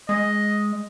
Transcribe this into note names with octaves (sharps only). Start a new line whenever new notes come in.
G#3 D#5